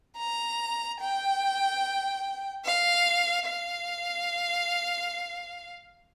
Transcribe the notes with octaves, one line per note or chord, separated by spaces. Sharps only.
A#5
G5
F5
F5